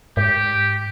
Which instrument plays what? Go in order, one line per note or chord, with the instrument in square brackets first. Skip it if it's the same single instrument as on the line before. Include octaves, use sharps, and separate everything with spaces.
[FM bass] G#2 [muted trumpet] G4